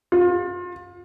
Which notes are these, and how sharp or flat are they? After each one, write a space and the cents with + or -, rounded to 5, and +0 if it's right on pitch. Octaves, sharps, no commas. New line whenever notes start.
F4 +30